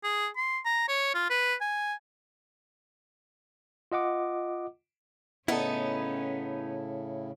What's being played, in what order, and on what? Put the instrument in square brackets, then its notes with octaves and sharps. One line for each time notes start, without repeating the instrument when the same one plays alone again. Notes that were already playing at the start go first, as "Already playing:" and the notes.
[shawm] G#4
C6
A#5
C#5
F4
B4
G#5
[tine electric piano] F4 D#5 F#5 D6
[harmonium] A2 C#3 [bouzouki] B3 D#4 [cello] C#4 [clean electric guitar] E4 A4